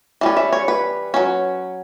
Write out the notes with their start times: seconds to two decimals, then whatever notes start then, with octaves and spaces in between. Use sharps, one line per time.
0.21 E3 G3 C#4
0.37 E5
0.53 C#5
0.68 B4
1.14 F#3 C#4